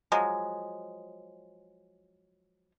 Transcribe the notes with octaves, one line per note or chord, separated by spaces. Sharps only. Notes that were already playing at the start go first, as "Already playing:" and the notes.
F3 F#3 G#3